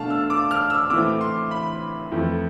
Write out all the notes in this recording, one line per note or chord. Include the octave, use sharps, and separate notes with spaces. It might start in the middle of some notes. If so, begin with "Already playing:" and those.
Already playing: B2 A3 D4 F5 A5
E6
D6
F6
E6
A2 E3 A3 C4 D6
C6
B5
F2 E3 A3